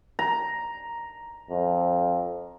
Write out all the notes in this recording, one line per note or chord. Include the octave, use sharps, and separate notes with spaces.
A#5
F2